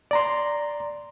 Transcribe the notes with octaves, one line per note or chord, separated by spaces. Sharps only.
D5 A#5 C6